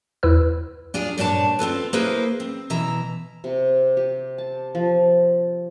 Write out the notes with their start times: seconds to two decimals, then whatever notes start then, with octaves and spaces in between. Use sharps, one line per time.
0.23 E2 E4 B4 E6
0.94 D4 F4 G#4
1.18 G2 A#2 D4 C#5 A5
1.59 C4 F4 A4 B4
1.93 A#3 E4 G#4 B4 C5
2.40 C4
2.70 B2 E3 E5 A#5
3.44 C3
3.97 G4
4.38 A5
4.75 F3